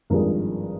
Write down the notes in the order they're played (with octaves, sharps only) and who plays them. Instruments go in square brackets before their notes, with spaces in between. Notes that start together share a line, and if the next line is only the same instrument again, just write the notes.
[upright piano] G#1 G2 F3 G#3 A#4